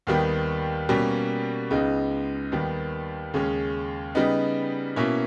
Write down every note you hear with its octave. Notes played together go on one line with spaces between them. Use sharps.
D#2 D#3 G3 B3
B2 G3 A#3 C#4
C#2 C#3 G#3 B3 D#4
D#2 D#3 G3 B3
D#2 C#3 G#3 C#4
C#3 G3 B3 D#4
B2 A#3 C#4 E4